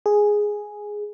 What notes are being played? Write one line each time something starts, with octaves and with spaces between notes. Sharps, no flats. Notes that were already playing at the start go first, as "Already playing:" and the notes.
G#4